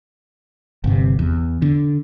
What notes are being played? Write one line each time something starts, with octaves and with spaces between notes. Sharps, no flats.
G1 C3
E2
D3